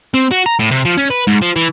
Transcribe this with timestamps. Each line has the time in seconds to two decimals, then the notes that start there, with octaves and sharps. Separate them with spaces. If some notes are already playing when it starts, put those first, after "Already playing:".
0.14 C4
0.31 F#4
0.46 A#5
0.60 A2
0.71 C3
0.85 F3
0.98 C#4
1.11 B4
1.27 G#2
1.42 F3
1.56 E3